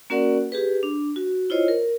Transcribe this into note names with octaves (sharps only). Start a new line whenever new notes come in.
A#3 C#4 F#4 A#4 D5 F#5
G4 G#4 B4
D4
F#4
E4 F4 C5 C#5 D#5
A#4